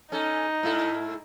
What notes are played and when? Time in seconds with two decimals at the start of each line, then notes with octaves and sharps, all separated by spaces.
0.12 C#4 D#4 A4
0.63 G#2 E4 A4